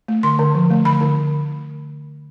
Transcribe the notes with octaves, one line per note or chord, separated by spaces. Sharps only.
A3
D3 C6
D3
F3
A3
D3 B5
D3